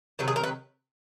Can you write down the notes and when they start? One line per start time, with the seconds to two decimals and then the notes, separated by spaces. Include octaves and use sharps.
0.19 C3 D#3 F#3 B4
0.28 G#4
0.36 A#4
0.44 B4